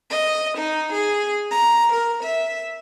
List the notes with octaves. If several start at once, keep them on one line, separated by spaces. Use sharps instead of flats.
D#5
D#4
G#4
A#5
A#4
E5